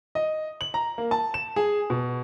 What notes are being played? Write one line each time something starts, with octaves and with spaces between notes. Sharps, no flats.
D#5
F#7
A#5
A#3
A5
E7
G#4
B2